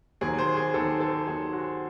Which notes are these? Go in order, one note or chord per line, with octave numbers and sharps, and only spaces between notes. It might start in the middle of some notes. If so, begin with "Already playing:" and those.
D#2 D#3 F#3 G#4
C5
G#4
D#2 D#3 F#3 A4
A4
D#2 D#3 F#3 G#4
F#4